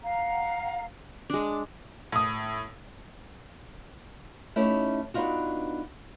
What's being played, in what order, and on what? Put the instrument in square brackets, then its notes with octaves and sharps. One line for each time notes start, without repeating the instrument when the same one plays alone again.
[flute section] F5 F#5 A#5
[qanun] G#3 D4 [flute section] D6
[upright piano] A2 D#6
[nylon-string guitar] A3 C#4 D#4 E4 G4
B3 D4 D#4 F4 F#4